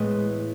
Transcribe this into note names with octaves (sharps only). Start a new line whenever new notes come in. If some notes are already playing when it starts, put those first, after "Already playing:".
Already playing: A2 E3 G#3 B3